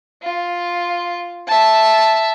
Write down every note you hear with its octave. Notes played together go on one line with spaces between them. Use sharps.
F4
E5 A5